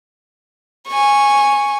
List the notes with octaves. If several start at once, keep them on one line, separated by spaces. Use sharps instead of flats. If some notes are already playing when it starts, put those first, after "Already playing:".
G#5 C#6